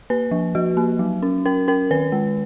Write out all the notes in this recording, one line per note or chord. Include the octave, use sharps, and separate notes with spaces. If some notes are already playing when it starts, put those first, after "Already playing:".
A#3 B4
F3
F3 F#4
A#3
F#3
C#4
C#4 A#4
C#4 A#4
D#3 B4
G#3